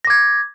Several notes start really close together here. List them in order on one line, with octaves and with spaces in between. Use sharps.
A#6 D6 G#6